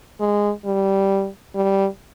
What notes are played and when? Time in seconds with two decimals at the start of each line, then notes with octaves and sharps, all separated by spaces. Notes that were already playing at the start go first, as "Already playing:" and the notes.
0.20 G#3
0.65 G3
1.55 G3